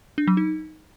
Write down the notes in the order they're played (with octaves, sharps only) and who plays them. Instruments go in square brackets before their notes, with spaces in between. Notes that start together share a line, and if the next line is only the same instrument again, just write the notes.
[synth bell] D4
F#3
D#4